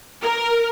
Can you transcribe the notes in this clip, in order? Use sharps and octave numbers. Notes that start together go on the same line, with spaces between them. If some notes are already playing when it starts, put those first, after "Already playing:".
A#4